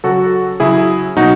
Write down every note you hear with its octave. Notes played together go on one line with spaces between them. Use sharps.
C#3 F#3 F#4 A4
C#3 F#3 E4 G#4
B2 F#3 D#4 F#4